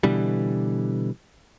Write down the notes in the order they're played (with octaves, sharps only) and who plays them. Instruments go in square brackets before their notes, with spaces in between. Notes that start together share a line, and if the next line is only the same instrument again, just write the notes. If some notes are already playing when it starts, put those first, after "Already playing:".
[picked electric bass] B2 D3 E3 G3